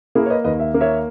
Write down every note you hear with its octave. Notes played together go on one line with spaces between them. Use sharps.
A#3 E4 G#4
C#5
B4 D#5
D#2 B4 D#5
E5
A#3
C#5 E5